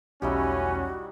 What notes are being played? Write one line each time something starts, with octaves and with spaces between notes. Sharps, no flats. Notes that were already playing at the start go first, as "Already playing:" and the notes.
B1 E2 G3 A3 C#4 D#4 E4 F#4